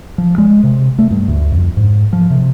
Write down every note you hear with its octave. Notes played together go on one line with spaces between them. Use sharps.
F3
G#3
C3
A3
G2
D2
F2
G#2
F3
C3